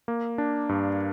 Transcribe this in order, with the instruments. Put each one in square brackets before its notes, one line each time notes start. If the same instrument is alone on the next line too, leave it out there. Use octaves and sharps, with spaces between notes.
[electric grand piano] A#3
D4
G2